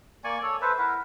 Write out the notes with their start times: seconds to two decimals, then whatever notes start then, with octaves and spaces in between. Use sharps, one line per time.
0.24 A#3 D5 G#5 C#6
0.43 A4 C#5
0.62 A4 B4 C5 E5
0.79 E4 A#4 E5 F#5